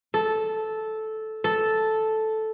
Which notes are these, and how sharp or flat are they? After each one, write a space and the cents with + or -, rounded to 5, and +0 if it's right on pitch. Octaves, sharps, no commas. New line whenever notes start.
A4 -10
A4 -5